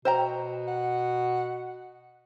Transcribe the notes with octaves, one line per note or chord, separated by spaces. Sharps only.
B2 C5 G5 A#5
F#5